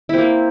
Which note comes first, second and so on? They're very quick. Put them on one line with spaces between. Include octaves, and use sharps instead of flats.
E4 C4 A#3